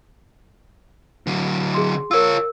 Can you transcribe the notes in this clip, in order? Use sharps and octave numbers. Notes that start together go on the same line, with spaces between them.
D3 F#3
G#4 C6
F4 A#4 C#5 E6